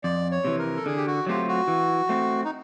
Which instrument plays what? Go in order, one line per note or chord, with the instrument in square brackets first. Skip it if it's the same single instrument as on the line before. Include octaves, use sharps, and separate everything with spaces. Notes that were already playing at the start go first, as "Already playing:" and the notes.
[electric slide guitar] F2 [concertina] D5
[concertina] C#5
[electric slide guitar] C3 E3
[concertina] A#4
A4
[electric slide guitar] D3 [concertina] G#4
[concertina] G4
F#4
[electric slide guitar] F#3 A3 C4 F4 [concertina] G4
[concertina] F#4
[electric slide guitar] E3
A3 C4
[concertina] D#4